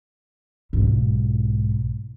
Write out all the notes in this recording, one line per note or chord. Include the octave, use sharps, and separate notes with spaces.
B1 G#2